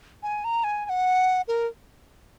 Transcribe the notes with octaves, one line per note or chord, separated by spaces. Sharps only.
G#5
A#5
G#5
G#5
F#5
A#4